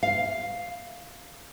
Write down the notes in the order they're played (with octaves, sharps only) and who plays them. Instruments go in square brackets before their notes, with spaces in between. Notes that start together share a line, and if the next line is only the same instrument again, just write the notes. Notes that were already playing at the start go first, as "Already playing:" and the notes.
[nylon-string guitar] F5